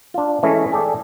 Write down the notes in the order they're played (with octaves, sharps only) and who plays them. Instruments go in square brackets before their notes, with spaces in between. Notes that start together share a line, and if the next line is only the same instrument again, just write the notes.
[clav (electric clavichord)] D4 F4
E3 G#3 A3 C#4 D#5
G#4 A4 D5 G5